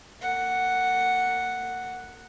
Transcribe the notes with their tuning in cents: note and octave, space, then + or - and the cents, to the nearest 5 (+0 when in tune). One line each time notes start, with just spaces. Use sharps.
A#3 -45 F#5 +0